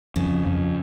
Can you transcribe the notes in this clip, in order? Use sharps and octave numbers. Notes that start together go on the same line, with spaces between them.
F2 C#3
F2